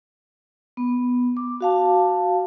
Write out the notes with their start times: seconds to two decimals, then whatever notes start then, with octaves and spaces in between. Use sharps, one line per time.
0.77 B3
1.37 D6
1.61 F#4 F5 A5